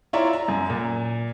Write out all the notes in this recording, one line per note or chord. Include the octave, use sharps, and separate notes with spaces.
E4 F4 C#5 D5 E5 A#5
A#5
F#2
A#2